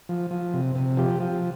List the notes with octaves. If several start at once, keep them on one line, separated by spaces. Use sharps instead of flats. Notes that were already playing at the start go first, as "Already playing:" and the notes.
F3
F3
C3
C3
F3 G4
F3